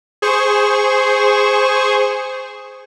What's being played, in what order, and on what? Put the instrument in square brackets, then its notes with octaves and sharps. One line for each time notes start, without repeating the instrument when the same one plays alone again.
[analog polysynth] G#4 C5 C#6